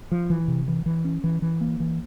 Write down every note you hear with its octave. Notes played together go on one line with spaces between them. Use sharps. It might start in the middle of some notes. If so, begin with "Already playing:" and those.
F3
E3
C3
E3
E3
C#4
E3
E3
A#3
E3